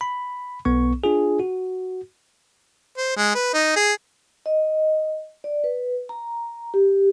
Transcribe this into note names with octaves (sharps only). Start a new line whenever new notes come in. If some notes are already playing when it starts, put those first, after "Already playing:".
B5
B1 B3 C#6
D4 F4 G#4
F#4
C5
G#3
B4
D#4
G#4
D#5
D5
B4
A#5
G4